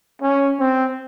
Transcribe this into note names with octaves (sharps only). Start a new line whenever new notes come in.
C#4
C4